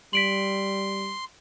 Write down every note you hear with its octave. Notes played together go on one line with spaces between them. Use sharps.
G3 C6 B6 D7 F#7